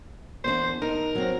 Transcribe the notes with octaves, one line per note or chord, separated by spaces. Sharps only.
E2 D4 C5
D#4 A#4
F#3 C4